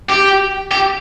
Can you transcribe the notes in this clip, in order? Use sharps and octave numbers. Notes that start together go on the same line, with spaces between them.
G4
G4